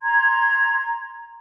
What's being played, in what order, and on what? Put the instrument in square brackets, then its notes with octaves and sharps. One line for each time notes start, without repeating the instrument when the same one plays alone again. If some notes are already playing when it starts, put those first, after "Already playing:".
[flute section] A#5 C6 G#6